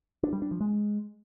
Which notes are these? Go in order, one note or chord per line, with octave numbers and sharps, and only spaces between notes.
D4
G3
D4
F3
G#3